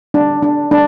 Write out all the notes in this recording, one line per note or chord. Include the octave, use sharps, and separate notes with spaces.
D4
D4
D4